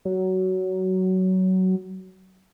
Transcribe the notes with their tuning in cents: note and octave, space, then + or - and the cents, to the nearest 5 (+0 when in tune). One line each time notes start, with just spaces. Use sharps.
F#3 +15